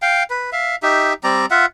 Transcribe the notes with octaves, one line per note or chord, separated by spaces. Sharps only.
F5 G5
B4
E5 F5
D#4 G4 E5
G3 C4 D5 A#5
F4 E5 F#5